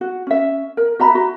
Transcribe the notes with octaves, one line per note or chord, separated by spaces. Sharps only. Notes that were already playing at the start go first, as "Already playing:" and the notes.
F#4
C#4 E5
A#4
F#4 E5 A#5 B5
F#4